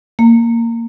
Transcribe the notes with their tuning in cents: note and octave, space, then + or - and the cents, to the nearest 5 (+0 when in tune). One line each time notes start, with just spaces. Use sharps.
A#3 -15